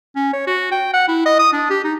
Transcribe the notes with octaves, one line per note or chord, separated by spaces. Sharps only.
C#4
C#5
F#4
G5
F#5
E4
D#5
D#6
D4
G4
D#4